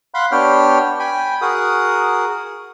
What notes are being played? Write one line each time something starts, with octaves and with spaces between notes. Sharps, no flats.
F5 F#5 B5 C6 F#6
B3 D4 G4 C#5 G5 F6
G5 G#5 B5
F#4 G#4 A#4 F#5 D#6